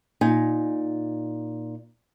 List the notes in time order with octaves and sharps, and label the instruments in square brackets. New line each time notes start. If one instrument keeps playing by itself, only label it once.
[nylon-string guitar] A#2 D#4 G#5